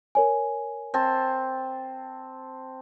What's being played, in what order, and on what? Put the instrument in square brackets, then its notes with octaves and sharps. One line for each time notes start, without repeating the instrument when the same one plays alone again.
[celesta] A#4 C#5 G#5
[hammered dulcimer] C4 A5